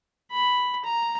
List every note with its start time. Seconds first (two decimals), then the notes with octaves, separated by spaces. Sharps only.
0.31 B5
0.84 A#5